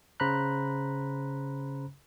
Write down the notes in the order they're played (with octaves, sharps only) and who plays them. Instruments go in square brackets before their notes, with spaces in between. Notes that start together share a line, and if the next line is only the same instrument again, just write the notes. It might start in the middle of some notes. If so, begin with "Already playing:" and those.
[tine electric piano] C#3 C5 A#5 B5 F#6